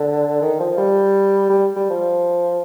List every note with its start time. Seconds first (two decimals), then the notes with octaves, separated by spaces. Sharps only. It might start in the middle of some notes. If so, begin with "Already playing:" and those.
Already playing: D3
0.41 D#3
0.60 F3
0.78 G3
1.50 G3
1.76 G3
1.90 F3